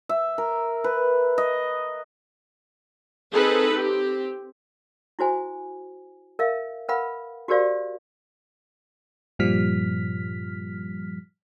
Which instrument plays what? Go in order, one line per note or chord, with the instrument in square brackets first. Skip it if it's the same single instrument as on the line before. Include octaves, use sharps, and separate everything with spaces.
[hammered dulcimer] E5
A#4
B4
D#5
[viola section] C4 D#4 G#4 A4 B4
C4 G4
[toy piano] E4 F#4 C5 G#5
A#4 E5 F5
A#4 B4 F5 F#5 B5
F#4 G4 A#4 C5 D5 F5
[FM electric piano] G2 A#2 F3 G3 F6 B6